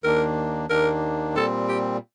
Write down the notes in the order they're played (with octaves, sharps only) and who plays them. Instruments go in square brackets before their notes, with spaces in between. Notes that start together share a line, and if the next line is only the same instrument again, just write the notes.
[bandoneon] D#2 D#3 A#3 D4 [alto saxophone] A#4
[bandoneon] D#2 D#3 A#3 D4 [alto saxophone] A#4
[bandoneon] A#2 G3 C4 [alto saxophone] A4
[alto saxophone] G4